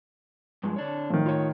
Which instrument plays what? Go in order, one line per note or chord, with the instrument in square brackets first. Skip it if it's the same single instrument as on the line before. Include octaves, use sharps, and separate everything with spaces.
[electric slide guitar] G2 F3 G#3
D3 D4 C#5
[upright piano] A2 D#3 [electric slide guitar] F3
[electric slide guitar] F4 C#5